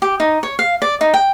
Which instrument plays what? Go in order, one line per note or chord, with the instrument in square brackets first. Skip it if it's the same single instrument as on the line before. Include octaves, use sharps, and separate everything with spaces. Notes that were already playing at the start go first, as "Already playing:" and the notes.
[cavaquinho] G4
D#4
C#5
F5
D5
D#4
G5